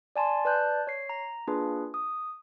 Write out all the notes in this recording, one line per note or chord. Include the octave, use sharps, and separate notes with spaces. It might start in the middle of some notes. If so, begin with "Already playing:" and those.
D5 G#5 A5 C6
B4 D5 A5 F#6 G6
C#5 C7
A#5
A#3 D4 F4 G#4 B4
D#6